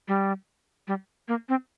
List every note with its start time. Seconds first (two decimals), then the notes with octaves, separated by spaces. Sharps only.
0.08 G3
0.88 G3
1.28 A#3
1.49 C4